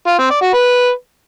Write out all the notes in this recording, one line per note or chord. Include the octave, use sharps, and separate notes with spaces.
F4
C4
D5
F#4
B4